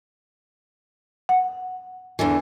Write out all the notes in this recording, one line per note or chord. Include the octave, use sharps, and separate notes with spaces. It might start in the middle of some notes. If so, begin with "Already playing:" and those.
F#5
E2 D3 E3